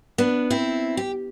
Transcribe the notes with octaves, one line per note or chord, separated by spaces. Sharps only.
B3 D4
C4 E4
G4